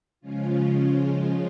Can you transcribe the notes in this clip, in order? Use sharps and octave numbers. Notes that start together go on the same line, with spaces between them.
C#3 F3 G#3 C#4 F4